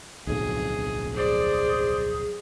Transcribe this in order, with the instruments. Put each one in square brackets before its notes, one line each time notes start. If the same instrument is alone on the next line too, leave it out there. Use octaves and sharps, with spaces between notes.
[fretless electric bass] D1 B1 F2 [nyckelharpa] G#4
[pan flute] G#4 [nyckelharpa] C5 D5